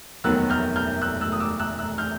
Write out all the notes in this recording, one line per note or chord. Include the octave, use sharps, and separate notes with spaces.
F1 D#2 D#3 F#3 B3 E6 F#6
F6 G6
F6 G6
E6 F#6
E6 F#6
D#6
D6 E6
E6 F#6
E6 F#6
F6 G6